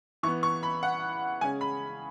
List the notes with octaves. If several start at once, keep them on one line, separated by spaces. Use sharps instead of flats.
E3 B3 C#6
C#6
B5
F#5
C#3 G#3 C#4 G#5
B5